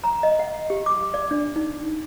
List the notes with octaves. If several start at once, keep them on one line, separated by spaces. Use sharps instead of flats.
A#5
D#5
F#5
G4
D6
D5
D4
D#4